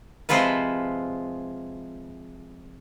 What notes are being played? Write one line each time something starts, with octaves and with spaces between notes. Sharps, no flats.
C3 F3 G#3 F4 B4